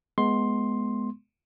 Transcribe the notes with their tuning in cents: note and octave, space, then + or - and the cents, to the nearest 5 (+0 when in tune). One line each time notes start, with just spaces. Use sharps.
G#3 +20 B3 +0 C6 +10